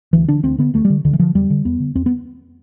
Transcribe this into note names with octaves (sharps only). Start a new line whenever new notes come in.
D2 E3
D3 D4
D2 C4
D3 B3
D2 A3
G3
D3
D2 D3
E3
D3 F3
E2 G3
D3
E2 B3
D3
E2 C4
B3